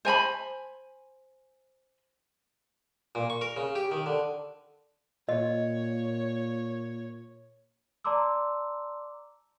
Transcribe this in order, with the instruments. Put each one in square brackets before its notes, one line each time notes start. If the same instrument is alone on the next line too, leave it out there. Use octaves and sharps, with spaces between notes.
[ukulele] C5 G#5 A#5 B5
[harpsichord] A#2
C#6
A#4
C#3
G4
D#3
D3
[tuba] A#2 [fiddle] C#5 [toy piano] D#5
[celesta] D5 A5 A#5 C6 D6 E6